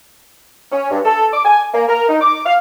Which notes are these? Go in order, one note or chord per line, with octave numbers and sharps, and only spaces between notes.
C#4
G2
A4
D6
G#5
A#3
A#4
D#4
D6
F5